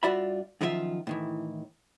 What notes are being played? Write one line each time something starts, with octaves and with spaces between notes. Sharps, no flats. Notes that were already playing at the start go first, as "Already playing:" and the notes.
G2 F4 F#4 D5 E5 B5
F#2 D#3 F3 E4 F4 E5
A2 D#3 E3